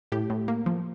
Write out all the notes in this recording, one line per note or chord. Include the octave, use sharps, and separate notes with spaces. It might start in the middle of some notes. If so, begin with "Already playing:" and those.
A2 G4
A2
A#3
F3